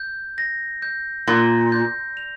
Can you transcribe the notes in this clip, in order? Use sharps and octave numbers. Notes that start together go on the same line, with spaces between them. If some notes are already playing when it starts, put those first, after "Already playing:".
Already playing: G6
A#6
G6
A#2 A#6
G6
F7